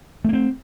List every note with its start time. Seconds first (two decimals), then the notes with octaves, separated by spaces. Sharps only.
0.25 A3
0.29 A#3
0.33 C4